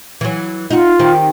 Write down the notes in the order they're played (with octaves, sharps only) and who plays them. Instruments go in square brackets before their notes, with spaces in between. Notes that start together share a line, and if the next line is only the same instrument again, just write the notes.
[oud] E3 F#3
[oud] D#4 F#4 [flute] F4
[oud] D#3 C4 G4